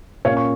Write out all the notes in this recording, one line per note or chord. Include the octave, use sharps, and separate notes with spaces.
A#2 A#3 C#4 C#5 F5
C#6